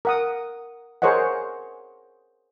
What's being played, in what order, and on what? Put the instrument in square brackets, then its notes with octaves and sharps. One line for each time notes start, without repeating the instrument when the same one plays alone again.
[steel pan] A#4 F#5 D#6
G#4 A#4 C5 C#5 D#5 F#5